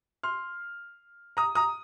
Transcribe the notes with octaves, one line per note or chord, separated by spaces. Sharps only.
C6 F6
A#5 D#6
A#5 D#6